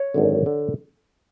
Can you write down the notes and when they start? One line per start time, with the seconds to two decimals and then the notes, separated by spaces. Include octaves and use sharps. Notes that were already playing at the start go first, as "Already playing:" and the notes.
Already playing: C#5
0.14 G#1 F#2 D3
0.46 D3